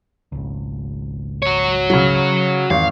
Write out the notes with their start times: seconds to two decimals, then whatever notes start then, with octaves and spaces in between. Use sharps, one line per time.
0.32 G#1 C#2
1.42 F#4 C#5
1.90 C#3 F#3
2.70 G#1 E2 F5